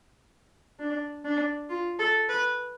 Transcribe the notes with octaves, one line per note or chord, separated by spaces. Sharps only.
D4
D4
F4
A4
B4